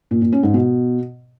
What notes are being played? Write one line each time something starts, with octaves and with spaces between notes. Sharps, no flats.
A#2
A#2
C#4
G#2
B2